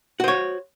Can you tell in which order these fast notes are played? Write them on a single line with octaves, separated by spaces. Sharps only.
F#4 C5 C#5